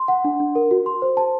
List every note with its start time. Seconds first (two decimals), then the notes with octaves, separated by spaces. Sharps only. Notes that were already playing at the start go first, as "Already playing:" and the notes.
Already playing: C6
0.08 F#5
0.24 D4
0.40 D4
0.55 A#4
0.71 F#4
0.86 C6
1.02 C5
1.17 A5